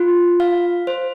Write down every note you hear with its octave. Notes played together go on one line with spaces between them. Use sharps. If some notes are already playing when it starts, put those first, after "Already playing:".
Already playing: F4
F5
C5